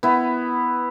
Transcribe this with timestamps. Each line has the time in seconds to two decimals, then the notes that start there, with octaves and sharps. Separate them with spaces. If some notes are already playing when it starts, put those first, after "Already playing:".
0.03 B3 E4